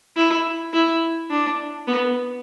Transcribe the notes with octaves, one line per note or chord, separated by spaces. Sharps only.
E4
E4
D4
B3